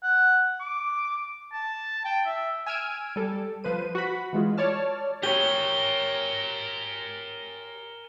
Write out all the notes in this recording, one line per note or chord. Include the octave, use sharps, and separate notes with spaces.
F#5
D6
A5
G5
E5
G#5 E6 F6 G#6 D7 D#7
G3 A4
F3 B4 C5 D#7
F#4 B5
E3 G#3 F4
C#5 D5 A5 F6
G4 A#4 C#5 G#5 G7